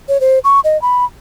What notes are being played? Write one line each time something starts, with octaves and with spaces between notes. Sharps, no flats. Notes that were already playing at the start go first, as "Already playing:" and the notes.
C#5
C5
C#6
D#5
B5